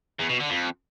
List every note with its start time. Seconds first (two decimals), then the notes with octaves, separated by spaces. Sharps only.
0.20 E2
0.30 B2
0.41 D3
0.51 F2